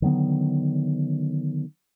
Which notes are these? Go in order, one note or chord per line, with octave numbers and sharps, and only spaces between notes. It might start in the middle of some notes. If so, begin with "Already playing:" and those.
D3 D#3 F#3 B3